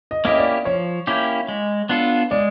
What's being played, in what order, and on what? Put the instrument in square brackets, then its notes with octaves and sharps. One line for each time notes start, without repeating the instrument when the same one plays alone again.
[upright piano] D#5
[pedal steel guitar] A#3 C#4 E4 G4 [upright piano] D#5
[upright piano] D5
[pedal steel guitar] F3 [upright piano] C#5
[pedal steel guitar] A#3 C#4 E4 G4
G#3
B3 D4 F4 A4
[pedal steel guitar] G#3 [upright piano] D5